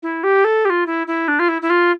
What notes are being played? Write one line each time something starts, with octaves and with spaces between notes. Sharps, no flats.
E4
G4
A4
G4
F4
E4
E4
D4
F4
E4
E4
F4